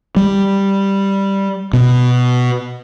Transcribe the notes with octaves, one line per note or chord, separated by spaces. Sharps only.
G3
B2